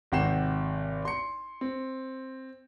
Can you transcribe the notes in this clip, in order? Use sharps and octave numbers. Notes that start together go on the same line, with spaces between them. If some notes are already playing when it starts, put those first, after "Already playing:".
G#1 C3 F#5 G5 C7 E7
C6 C#7
C4